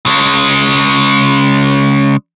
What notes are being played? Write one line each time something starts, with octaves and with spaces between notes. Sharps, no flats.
C#3 G#3